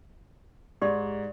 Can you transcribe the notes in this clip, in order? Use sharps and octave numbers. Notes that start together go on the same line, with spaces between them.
G#2 G4 D5 C6